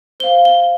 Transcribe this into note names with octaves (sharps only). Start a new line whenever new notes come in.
C5 F5 G7
G7